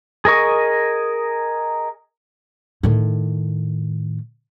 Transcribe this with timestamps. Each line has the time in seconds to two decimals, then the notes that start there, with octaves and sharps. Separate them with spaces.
0.25 G#4 A#4 D#5 C#6
2.83 A2 D#3